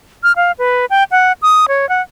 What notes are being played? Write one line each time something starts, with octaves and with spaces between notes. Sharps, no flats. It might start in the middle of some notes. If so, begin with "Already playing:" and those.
F6
F5
B4
G5
F#5
D#6
C#5
F#5